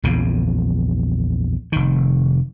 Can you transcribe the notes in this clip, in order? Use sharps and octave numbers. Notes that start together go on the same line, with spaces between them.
A#1 E2 C#3 F3
F1 D#3